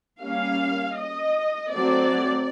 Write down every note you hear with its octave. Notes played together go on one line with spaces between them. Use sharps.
G3 A#3 C#4 F5
D#5
F#3 A3 C4 D5